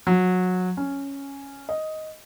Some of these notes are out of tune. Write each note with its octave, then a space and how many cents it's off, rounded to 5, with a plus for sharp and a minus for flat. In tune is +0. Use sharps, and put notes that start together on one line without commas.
F#3 -20
C#4 +0
D#5 +5